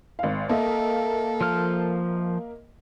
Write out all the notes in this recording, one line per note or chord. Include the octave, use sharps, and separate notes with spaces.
G#1 F5
A#3 A4 D#5 E5
F3 C5 F6